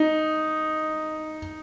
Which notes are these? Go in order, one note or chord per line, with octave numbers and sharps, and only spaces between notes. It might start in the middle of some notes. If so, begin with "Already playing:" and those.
Already playing: D#4